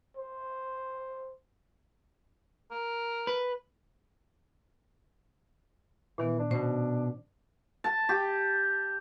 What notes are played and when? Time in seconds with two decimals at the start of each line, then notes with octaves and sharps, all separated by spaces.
0.17 C5
2.71 A#4
3.27 B4
6.18 A#2 D#3 E3 B3
6.39 D4
6.51 B2 C#4 C5
7.84 A5
8.09 G4